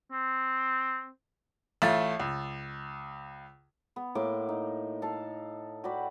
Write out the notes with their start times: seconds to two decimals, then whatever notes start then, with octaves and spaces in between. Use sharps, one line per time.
0.12 C4
1.82 A1 A3 F4 A6
2.20 C#2
3.96 B3
4.15 A2 A#3 C6 D6
4.49 D#4
5.02 A4 F5 A5
5.84 F#4 G4 D5 B5